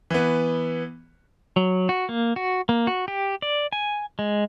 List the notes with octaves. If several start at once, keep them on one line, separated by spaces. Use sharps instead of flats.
E3 B3
F#3
F#4
A#3
F#4
A#3
F#4
G4
D5
G#5
G#3